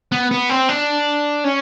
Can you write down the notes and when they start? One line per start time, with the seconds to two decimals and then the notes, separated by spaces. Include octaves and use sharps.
0.12 B3
0.31 B3
0.49 C4
0.69 D4
1.44 C#4